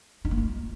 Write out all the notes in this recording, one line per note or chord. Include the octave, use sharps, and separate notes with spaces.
D#4
A#3
F4